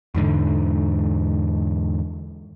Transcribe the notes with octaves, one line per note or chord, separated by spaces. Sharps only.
E2 G#2 D3